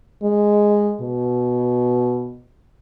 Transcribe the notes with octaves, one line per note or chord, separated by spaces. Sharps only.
G#3
B2